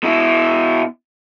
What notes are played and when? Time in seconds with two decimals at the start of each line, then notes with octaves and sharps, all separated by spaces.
0.03 B2 E4